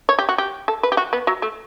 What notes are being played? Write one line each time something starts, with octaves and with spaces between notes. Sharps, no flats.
C#5
G4
F#4
G4
A4
B4
G4
F#4
B3
F#3
A3